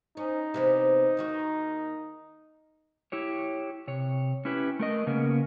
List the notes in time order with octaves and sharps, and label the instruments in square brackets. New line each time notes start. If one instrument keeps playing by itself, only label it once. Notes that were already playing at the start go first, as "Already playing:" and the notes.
[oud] C#4 [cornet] D#4
[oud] C3 E3 B3
D#2 D#3 F#4
[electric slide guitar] E4 G4 C#5
C3 C#5
C#4 E4 G4 B4
A3 A#4 D#5
C#3 A#3 B3 C#4 A#4